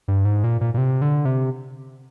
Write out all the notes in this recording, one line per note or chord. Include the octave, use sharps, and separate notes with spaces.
G2
G#2
A#2
A#2
A#2
C3
D3
C3